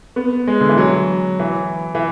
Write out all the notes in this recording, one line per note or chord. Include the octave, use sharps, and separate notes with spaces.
B3
G#3
D3
E3
F#3
E3
E3